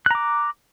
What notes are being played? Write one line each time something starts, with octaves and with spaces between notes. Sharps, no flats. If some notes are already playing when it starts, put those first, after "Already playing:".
A#5 D6 F#6